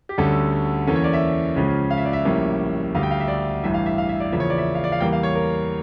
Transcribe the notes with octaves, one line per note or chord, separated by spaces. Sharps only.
G4
D2 D3 G3 C#4 A4
E2 E3 A#3 C#4 A4
C#5
D5
E5
C#2 C#3 F3 C#4
F5
E5
D5
E5
A#1 A2 G3 A#3 C#4
D2 D3 G3 F5
G5
F5
E5
D5
A1 G2 E3 E5
F5
E5
F5
E5
D5
E2 C#3 F3 A#3 E5
C#5
D5
E5
F5
D5
F5
E2 E3 G3 A#3 G5
F5
C#5
A#4